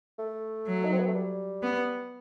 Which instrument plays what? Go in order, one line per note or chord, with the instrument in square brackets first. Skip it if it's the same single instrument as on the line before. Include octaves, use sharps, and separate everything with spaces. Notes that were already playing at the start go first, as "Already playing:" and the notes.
[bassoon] A3
[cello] F#3
[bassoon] D#4
C4
B3
A3
G3
[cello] B3